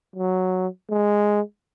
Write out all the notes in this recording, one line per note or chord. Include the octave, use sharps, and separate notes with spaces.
F#3
G#3